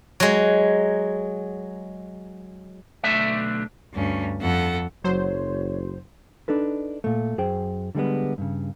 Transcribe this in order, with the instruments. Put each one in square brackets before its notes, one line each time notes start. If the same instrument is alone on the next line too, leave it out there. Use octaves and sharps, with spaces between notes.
[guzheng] F#3 G#3
[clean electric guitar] B1 D3 A3 D4 E5
[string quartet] D2 G2 C#4
F2 A4 F#5
[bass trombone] F#1 [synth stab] F#3 C5 [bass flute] C#5
[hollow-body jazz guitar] D4 D#4 A4 B4
A#2 A3
F#2 G#4 C5 G5
D3 G3 G#3 B3
G2 C#3